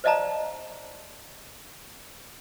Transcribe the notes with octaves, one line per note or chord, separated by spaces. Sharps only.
C5 D5 D#5 F5 A5 A#5